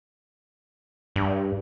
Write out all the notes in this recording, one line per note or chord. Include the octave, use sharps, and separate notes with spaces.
G2